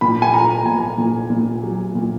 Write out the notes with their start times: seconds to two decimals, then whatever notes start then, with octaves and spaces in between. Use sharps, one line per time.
0.01 A#2 B5
0.22 G#5
0.34 A#2 A#5
0.66 A#2 G#5
0.98 A#2
1.30 A#2
1.63 F#3
1.95 A#2